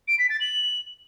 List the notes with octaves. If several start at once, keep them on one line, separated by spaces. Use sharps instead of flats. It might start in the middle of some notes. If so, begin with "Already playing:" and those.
D7
B6
A6
F#7